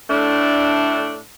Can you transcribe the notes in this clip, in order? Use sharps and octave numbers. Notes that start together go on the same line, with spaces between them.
A2 A3 D4